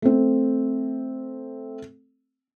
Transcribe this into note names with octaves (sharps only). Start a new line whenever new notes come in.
A3 C4